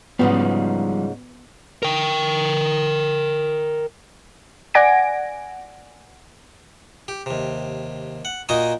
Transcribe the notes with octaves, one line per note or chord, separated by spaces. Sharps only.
G#2 C#3 F3 G3 B3 D#4
A#4 G5
D5 F#5 G#5 G#6 A#6 D7
G4
D#2 C3
F#5
A#2 D#4 F#4 D#5 G#5 D#6